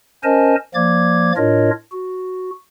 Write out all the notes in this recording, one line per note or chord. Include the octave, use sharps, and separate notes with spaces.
C#4 A#4 C5 D#5 G#5 A5
F3 A#3 D5 D6 G#6
A2 D4 F4 A#4 C#5 D#5
F#4